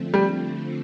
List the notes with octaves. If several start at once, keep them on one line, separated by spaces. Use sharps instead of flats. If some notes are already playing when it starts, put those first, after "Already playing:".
Already playing: D3 F3 A3 C4
G3